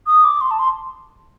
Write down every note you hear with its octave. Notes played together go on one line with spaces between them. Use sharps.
D#6
D6
C6
A5
C6